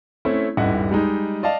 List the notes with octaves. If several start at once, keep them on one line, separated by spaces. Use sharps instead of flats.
A3 C4 C#4 E4
D#1 G#1 G2 E4 D#5 F#5
G3 G#3 D#4
D5 D#5 F5 A5